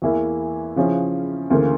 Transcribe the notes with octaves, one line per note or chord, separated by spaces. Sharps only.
E2 E3 A#3 E4
C#3 F3 C#4 E4
D2 C#3 E3 A#3